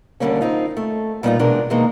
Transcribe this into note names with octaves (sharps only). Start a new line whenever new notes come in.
D#2 A2 D3 G3 A#3 C#4
C4 D#4 F4
A3
A#2 G3 B3 D4 D#4 F4
B2 E3 G#3 D4 A#4
B2 D#3 E3 G#3 A#3 D#4